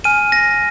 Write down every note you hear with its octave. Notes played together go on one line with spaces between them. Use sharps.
G#5 F6 D#7
A#6